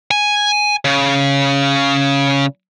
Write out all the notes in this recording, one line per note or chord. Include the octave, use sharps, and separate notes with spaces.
G#5
C#3